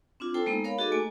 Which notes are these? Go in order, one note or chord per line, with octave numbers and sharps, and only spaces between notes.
C4 D4 F4
E4 A4 C5 G5 A5
G#3 A#3 B3 D#4
A#4 C#5 F5 B5
D#4 F#4 G#4 A4 D#5 D6
A3 A#3 G#5 A5